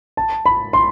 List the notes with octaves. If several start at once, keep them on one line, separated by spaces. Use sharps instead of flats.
A5
B5
C6